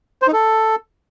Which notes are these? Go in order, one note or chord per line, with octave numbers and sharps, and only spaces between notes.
C5
D#4
A4